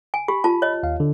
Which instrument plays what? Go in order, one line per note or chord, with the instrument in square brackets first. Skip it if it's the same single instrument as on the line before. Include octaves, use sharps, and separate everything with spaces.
[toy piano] G#5
[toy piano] G4 [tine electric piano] B5
[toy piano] F4 A5
C#5 D#5
[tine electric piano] D#2 F5
D3